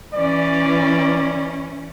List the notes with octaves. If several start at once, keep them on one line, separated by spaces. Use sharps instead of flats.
E3 C#4 D5